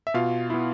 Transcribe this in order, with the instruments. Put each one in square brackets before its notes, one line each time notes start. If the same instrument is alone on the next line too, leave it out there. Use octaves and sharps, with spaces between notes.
[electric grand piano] E5
B2 F4 F5
B3 E4